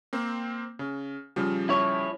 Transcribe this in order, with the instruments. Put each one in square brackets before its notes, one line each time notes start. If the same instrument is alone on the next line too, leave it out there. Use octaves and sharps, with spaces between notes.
[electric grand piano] A#3 C4
C#3
C#3 F3 G3
[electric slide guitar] E4 C#5